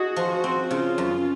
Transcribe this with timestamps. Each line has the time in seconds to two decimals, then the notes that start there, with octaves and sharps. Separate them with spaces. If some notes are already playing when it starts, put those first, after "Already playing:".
Already playing: D#4 F#4 G#4
0.16 F3
0.30 F#4
0.44 C4
0.71 C#3 F4
0.98 F#2